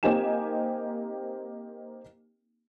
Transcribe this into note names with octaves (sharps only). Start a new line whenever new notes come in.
A#3 C4 D#4 G4 G#5 E7